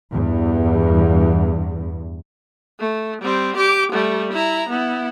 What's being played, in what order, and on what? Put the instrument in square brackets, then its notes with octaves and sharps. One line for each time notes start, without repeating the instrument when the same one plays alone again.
[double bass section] E2 G2
[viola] A3
G3 C4
G4 D6
G3 A3
E4 A#5
B3 E4